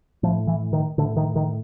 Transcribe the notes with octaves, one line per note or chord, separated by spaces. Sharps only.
A2 F3
E3
D#3
A2 D3
D#3
D#3